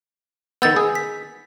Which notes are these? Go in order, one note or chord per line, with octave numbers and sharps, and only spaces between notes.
D#3 B3 E6 G6 A6
G#4
B6